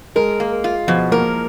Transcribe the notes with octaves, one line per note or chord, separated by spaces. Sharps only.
G#3 A#4
A#3
F4
B2 F3
A#3 A#4